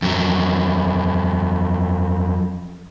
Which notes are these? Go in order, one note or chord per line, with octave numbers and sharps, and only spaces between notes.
F2 F#3